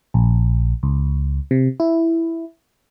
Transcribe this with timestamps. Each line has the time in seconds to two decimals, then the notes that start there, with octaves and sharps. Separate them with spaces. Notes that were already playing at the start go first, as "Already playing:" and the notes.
0.14 A#1
0.83 C#2
1.51 C3
1.80 E4